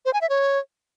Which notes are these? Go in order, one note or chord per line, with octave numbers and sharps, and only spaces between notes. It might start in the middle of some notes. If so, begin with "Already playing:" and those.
C5
G#5
E5
C#5